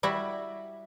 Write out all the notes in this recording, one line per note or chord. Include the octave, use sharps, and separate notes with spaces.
G3 E4 F#4 E5